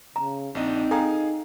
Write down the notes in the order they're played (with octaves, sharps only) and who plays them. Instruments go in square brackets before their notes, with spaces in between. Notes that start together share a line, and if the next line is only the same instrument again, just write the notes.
[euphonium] C#3 [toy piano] A#5
[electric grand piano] A#1 D4 D#5 [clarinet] C4 [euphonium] D#4
[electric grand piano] G#4 F5 G#5 [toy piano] A4 G5 A#5